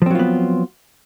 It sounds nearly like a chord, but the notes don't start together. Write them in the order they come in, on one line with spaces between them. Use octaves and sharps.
F3 C4 F#3 F4 B3